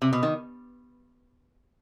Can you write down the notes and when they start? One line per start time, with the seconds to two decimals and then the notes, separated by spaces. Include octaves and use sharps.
0.02 C3
0.13 B2
0.23 D#3